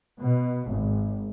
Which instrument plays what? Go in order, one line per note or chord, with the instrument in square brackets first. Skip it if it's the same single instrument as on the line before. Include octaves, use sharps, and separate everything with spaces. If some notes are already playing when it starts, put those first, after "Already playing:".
[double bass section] B2
G#1